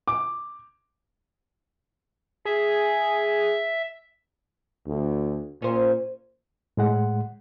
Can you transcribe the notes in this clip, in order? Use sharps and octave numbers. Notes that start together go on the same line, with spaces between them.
D6
G#4 E5
D2
A#2 C#4 C5
A2 G#3 F#5